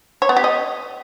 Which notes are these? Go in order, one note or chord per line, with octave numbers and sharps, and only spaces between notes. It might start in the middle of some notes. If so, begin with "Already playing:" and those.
C#5
B3
G4
D#5